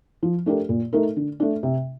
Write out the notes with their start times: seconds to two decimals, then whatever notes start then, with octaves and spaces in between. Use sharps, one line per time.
0.23 F3
0.46 A3 D4 G4 A#4
0.69 A#2
0.93 A3 D#4 A#4
1.16 D3
1.40 A3 D4
1.63 C3